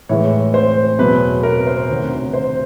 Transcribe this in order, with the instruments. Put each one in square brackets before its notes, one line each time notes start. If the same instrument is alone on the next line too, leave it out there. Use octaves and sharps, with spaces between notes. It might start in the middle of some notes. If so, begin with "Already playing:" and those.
[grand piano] A2 E3 G#3 C#5
C5
E2 B2 F#3 B4
A#4
B4
C5
C#5
D2 C3 D#3
C5